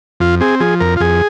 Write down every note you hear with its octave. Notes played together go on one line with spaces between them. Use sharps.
F2 F4
C4 G#4
F3 G#4
F2 A#4
F4
F2 G#4